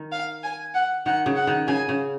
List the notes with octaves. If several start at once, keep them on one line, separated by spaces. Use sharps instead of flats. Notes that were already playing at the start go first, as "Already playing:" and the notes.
Already playing: D#3
F5
G#5
F#5
D#3 F#5
C#3
F#5
D#3
C#3 G#5
C#3